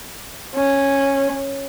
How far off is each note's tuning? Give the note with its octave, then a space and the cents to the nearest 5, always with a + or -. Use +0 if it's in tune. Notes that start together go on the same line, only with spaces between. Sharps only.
C#4 -10